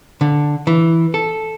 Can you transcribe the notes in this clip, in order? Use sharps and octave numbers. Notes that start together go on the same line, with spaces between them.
D3
E3
A4